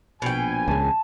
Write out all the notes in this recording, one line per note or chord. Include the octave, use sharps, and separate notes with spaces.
A#1 B2 G5 G#5
C#2 C#3 A5